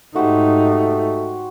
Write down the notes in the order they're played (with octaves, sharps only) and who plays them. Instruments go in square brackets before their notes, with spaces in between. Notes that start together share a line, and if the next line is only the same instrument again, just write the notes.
[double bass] G#2 D#4 [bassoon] A3 [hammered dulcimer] F#4 G4 C5